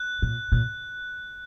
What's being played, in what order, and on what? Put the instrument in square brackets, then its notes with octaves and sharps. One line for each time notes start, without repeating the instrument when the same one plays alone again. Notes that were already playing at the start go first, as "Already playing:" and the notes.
Already playing: [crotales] F#6
[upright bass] A#2
A#2